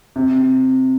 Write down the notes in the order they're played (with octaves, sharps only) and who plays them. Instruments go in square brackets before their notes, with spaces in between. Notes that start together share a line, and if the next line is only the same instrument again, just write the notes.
[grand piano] C3